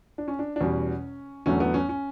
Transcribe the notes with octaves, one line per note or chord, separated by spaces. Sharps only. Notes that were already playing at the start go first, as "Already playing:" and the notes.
D4
C#4
D4
D4
E2 B2 G3 C#4
E2 D3 F#3 A3 C#4
B3
C#4
C#4